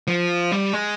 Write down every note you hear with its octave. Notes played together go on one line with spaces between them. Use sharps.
F3
G3
G#3